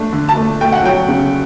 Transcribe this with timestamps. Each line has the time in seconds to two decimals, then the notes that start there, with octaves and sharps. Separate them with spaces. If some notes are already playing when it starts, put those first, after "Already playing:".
Already playing: A3 D4
0.13 D3
0.29 A5
0.37 A3
0.61 A3 G5
0.72 F#5
0.84 F#3 G5
1.08 C#3